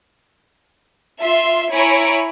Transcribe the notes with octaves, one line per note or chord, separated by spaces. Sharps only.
F4 E5 C6
E4 C#5 G#5 A#5 B5 D7